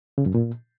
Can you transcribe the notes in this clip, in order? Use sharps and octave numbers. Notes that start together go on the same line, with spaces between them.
C#3
F#2
A#2